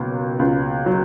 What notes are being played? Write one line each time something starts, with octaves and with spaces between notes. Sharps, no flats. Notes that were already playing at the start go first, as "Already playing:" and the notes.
Already playing: C#2 B2 F#3 A#3
C#2
F#3